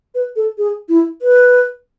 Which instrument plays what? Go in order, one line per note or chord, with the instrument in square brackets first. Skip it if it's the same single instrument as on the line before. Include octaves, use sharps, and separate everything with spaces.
[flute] B4
A4
G#4
E4
B4